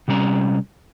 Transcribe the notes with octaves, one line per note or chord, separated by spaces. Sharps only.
C3 G3 C#4 A#5